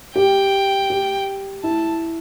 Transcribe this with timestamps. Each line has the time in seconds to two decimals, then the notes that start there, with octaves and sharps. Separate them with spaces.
0.15 G4 G5
0.90 G4
1.63 E4 A5